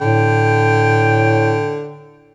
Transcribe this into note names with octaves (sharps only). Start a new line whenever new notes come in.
A2 D3 G5